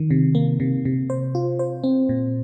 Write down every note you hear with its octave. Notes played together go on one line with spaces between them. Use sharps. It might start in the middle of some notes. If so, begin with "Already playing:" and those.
Already playing: D#3
C3
A#3
C3
C3
C5
F4
C5
C4
A#2